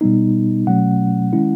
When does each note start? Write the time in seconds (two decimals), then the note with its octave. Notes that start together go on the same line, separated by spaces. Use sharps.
0.01 B2 G3 B3 D#4
0.67 B2 F#3 A3 C#4 F#5
1.33 D#3 G#3 C#4 E4